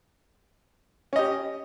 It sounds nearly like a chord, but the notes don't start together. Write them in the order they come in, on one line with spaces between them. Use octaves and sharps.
C#4 D#5 G4